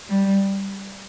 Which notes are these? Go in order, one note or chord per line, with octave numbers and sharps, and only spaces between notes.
G3